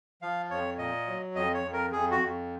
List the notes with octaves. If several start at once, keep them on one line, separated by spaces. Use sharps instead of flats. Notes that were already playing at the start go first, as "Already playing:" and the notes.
F3 F5
F2 C#5
A#2 D#5
F#3
F2 D#5
C#5
F2
A#4
F2 G#4
F#4
F2